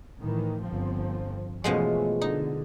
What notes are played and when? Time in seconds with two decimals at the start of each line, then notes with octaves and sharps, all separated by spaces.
0.19 A2 D#3 E3
0.63 G1 F3 C4
1.64 B2 E3 F3 G#3 A3 C#4
2.21 D3 D#4